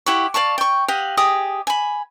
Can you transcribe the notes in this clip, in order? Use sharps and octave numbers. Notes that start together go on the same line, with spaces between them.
E4 G4 F#5 C#6
D5 F5 A5 C#6
G5 C#6
G4 D#5 F5 F#5
G4 G#4 D#5 D#6
G#5 B5